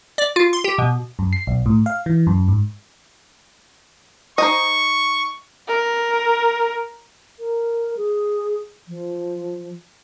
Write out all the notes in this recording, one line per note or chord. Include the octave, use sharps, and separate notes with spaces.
D5
F4
C6
G4
B2
F#2
C7
B1
A2
F5
E3
F#2
G#2
D#4 C5 D#5 C#6
A#4
A#4
G#4
F3